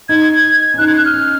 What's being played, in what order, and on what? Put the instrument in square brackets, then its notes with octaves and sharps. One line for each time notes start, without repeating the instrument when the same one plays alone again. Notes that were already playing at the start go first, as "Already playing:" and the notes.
[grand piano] D#4 [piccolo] G#6
[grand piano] C#4
[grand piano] D#4 [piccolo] F#6
[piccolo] G#6
F#6
F6
[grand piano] C#4